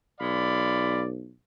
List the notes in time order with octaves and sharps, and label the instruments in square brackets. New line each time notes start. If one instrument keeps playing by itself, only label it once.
[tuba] B1 [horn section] G#3 F5 B5 [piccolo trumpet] D5